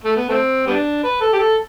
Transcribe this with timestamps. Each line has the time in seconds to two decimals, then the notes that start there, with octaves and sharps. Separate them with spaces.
0.04 A3
0.16 B3
0.29 A3 C4
0.67 G3 B3 D4
1.03 B4
1.21 A4
1.33 G4
1.39 A4